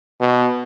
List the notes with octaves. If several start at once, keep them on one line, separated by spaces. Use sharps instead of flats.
B2